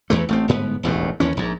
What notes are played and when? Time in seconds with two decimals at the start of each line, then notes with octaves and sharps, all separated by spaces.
0.10 E2 E3 A3
0.29 A1 A3 C4
0.48 G1 G#2 B3
0.83 E1 A1 D#2 A2
1.20 D#2 E3 C#4
1.37 A#1 G#2